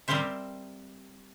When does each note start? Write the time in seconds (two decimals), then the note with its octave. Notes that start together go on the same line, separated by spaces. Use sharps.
0.08 G3 C4 G4 A#4 C5 E5